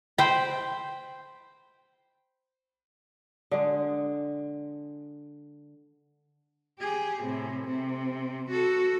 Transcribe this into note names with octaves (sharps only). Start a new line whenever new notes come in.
C5 G5 B5
D3 G#3
G4 G#4
A2 C3
C3
F#4 A4